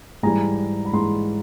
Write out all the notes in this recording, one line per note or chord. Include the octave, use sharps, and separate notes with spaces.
G#2 E3 G3 G#5 A#5
B5
G#2 E3 G3 A#5 C6